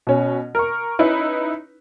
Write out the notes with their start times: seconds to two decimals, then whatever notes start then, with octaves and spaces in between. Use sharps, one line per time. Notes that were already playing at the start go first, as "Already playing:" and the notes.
0.07 B2 C#4
0.55 A#4 C#6
0.99 C#4 D#4 E4 B4